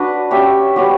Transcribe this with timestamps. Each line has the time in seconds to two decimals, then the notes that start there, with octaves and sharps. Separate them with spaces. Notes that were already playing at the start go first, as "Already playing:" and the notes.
Already playing: D4 F#4 B4 D5
0.31 C#4 G4 C#5 E5
0.76 G3 B3 F#4 C#5